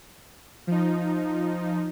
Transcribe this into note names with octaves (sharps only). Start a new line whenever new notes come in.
F3 D#4